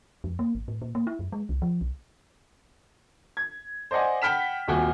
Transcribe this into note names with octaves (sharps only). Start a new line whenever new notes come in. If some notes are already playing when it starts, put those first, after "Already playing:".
F2
A#3
G#1
A2
A#2
A#3
E4
F#2
G#3
C2
F3
B1
G#6
C5 D5 D#5 F#5 G#5
F#5 G5 B5 F6 B6 E7
D#1 C2 F#4 G5 G#5 F#6